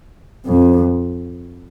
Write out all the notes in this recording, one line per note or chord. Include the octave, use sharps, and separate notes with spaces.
F2